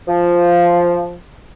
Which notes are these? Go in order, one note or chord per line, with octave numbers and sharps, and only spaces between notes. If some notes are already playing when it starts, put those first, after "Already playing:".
F3